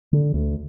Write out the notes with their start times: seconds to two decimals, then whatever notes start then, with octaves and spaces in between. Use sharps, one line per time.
0.13 D3
0.34 D2